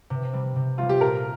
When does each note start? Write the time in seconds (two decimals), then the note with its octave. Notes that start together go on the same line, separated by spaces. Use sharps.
0.10 C3
0.33 G3 C4
0.56 C3
0.78 G3 C4 F4
0.89 G4
1.00 A#2 A#4